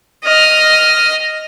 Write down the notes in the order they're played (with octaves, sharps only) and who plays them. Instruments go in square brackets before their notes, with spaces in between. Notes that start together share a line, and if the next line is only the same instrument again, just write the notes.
[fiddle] D#5 F6